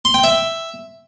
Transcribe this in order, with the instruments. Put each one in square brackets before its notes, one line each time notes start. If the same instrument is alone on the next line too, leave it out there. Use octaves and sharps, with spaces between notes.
[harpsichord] C6
G5
E5